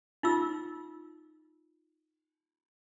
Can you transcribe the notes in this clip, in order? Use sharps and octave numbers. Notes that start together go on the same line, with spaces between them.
D#4 F4 E6